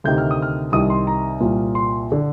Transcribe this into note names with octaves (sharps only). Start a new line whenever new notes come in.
D2 C3 D#3 G6
F6
D#6
F6
C2 C3 D#3 D#6
C6
A#5
C2 A#2
C6
D3